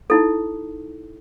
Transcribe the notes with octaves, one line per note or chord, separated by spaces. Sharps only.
D#4 E4 A4